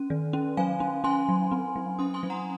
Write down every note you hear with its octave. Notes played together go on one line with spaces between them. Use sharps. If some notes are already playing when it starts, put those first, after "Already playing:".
Already playing: C#4
D#3
C#4
F#3 F5 G#5
C#4
C#4 G#5 C6
F#3
C4
F#3
C#4 C6 D#6
G#5 C6
F#3
F#5 A#5